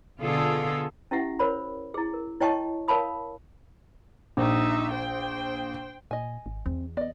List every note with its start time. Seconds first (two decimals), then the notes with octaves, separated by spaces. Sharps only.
0.20 B2 D3 F4 G#4 A4
1.11 C#4 E4 G4 E5 F#5
1.39 A#4 C5 C#5 B5
1.94 E4 G#4
2.14 A#4
2.40 E4 C#5 D#5 G5 A5 C#6
2.88 A#4 C#5 F5 A5 B5 D#6
4.37 A#1 D#4 E5
4.92 C5 G5
6.11 A#2 D#5 G#5
6.46 G#1
6.66 E2 C4
6.97 B3 D5 D#5